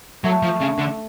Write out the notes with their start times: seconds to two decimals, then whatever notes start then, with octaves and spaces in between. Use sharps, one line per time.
0.24 F#3 A3
0.42 F3
0.60 C#3
0.78 D3